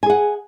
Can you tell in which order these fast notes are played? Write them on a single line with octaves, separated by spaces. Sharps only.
G#5 G#4 F#5